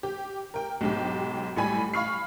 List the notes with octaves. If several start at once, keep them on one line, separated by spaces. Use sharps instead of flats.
G4
A#4 G5
B1 G#2 G4
A1 A2 G3 G#5 B5
F5 B5 C#6 F6 C7